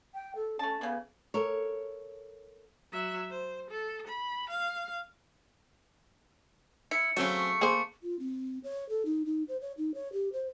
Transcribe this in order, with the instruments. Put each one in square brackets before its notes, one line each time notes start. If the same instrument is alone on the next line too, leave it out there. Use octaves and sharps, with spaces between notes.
[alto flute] G5
A4
[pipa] A3 A5 [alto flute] C#4
[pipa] C#3 E3 [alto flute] B3
[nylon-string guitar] A4 A#4 C#5
[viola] F#3 E5
C5
A4
B5
F5
[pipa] E4 [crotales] C#7
[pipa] C#3 A3 [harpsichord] F#3 C4 C#4
[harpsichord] A#3 [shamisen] G#4 C5
[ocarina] F4
C4
C#5
A4
D#4
D#4
C5
C#5
D#4
C#5
G4
C5